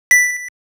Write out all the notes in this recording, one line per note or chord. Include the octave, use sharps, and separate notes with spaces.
B6